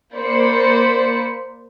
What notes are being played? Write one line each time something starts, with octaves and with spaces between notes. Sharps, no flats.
A#3 C5 D5 B5 C#7